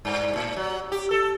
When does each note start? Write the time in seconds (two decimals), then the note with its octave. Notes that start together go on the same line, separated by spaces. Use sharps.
0.05 G2
0.36 A2
0.57 F#3
0.92 G4
1.11 A4